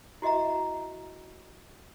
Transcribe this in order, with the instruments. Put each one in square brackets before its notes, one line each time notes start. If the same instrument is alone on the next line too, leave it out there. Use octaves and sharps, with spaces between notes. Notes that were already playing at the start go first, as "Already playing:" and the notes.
[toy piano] E4 F#4 D#5 E5 A#5